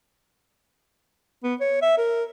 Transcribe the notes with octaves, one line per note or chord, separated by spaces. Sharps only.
B3
C#5
E5
A#4